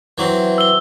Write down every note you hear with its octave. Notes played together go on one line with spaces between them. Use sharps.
E3 F#3 C4
E6 G7